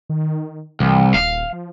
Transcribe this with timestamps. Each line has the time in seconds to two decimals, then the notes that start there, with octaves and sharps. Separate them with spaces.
0.09 D#3
0.80 C2 E3
1.14 D#1 F5
1.53 F3